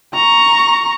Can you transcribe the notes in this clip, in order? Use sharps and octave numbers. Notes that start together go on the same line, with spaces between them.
A#5 C#6